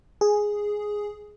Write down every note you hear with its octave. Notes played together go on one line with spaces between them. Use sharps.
G#4